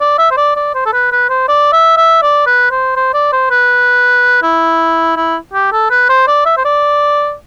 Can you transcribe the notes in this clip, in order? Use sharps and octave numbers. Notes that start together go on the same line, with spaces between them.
D5
E5
C5
D5
D5
C5
A4
B4
B4
C5
D5
E5
E5
D5
B4
C5
C5
D5
C5
B4
E4
E4
G4
A4
B4
C5
D5
E5
C5
D5